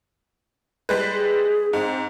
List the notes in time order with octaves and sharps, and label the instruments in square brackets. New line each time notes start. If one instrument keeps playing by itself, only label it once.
[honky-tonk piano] G3 G#3 B4
[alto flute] G#4
[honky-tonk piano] G#2 [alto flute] C4